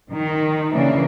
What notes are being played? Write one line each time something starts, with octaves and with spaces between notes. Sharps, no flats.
D#3
C#3 E3 A#3 D4